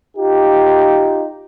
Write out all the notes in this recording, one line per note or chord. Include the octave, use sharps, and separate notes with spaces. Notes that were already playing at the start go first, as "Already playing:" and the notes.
D#4 F4 G4